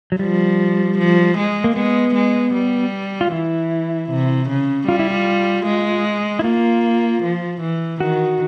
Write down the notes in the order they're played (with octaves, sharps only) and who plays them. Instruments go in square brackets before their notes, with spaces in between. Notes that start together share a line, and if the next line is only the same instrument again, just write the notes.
[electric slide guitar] F#3
[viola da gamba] F3 [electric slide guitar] G3
[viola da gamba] F3
G#3
[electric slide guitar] A#3
[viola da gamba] G#3 [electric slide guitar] B3
[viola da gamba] G#3
G3
[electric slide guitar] F4
[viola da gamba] E3 [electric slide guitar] E4
[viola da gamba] C3
C#3
[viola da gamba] G3 [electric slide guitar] F4
[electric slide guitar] E4
F4
[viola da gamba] G#3
[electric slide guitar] E4
[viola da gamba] A#3 [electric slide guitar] F4
[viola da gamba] F3
E3
[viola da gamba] D#3 [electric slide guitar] F#4